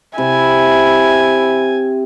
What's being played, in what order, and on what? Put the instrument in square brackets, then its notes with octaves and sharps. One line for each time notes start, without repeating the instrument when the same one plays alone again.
[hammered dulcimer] C3 [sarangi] E4 [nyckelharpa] G#5